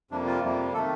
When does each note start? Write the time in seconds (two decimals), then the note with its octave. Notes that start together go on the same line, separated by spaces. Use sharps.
0.11 F2 C3 G3 A#3 D4
0.26 F4
0.42 F2 C3 G3 A#3
0.74 D#3 A3 A4